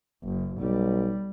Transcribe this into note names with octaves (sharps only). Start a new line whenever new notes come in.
F#1
B1 G3